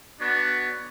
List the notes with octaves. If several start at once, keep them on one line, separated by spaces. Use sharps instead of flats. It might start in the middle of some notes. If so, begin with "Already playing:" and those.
B3 D4 F#4 C#5